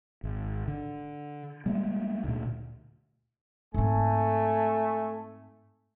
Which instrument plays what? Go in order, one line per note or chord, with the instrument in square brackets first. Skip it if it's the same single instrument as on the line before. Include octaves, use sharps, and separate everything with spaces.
[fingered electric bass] G#1
D3
G3 G#3 A#3
D2 A#2
[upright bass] G#2 C4 [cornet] A3 [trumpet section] G#5